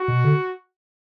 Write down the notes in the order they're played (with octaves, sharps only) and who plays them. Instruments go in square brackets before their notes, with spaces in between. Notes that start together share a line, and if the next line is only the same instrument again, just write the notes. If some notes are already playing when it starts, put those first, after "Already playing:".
Already playing: [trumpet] F#4
[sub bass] B2
D3